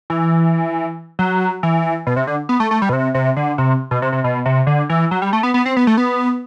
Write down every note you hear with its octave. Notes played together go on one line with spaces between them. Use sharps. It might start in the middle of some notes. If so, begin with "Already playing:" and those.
E3
F#3
E3
B2
C3
D3
B3
A3
A3
G3
B2
C3
C3
D3
C3
B2
C3
C3
B2
C3
D3
E3
F#3
G3
A3
B3
B3
C4
B3
A3
B3